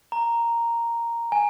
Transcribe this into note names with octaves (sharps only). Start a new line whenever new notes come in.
A#5
G#5